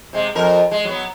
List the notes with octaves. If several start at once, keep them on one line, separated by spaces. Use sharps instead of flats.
C3 G#3
F2 A#4
G#3
F#3 B3